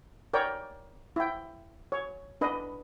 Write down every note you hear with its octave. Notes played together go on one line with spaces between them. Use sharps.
A#4 C#5 D5 G5
E4 G5
C#5
D4 B4 D#5